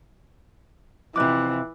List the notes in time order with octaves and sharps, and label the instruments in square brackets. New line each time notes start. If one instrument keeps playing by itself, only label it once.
[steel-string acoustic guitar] F2 C3 [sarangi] E3 [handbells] D6 F#6